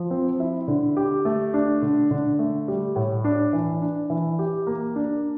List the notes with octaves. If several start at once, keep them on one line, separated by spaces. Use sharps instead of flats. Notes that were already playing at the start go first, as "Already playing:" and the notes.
Already playing: F3
C4
E4
D3
G4
A3
D4
D3
D3
A3
G3
A2
D4
E3
D4
E3
G4
A#3
D4